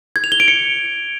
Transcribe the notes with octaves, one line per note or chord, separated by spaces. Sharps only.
G#6
F7
G7
D7
C#7